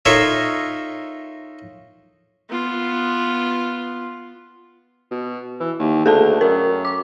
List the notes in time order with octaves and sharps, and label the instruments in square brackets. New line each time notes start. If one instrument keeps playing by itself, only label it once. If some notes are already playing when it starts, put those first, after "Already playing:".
[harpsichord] D#4 F4 A4 A#4 C#5 E5
[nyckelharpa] B3 F4
[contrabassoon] B2
E3
D#2
[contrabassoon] D2 [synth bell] G#4 A4 A5
[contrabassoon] F#2 [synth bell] A#4
[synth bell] D6